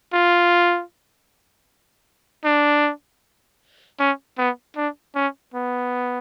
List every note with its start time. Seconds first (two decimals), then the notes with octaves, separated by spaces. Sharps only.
0.13 F4
2.44 D4
3.99 C#4
4.38 B3
4.76 D4
5.15 C#4
5.54 B3